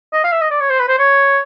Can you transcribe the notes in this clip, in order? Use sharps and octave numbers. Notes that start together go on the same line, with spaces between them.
D#5
F5
E5
D#5
D5
C#5
C5
B4
C5
C#5